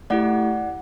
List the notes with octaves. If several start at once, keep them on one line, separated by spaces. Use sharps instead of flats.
A3 E4 G4 D5 F#5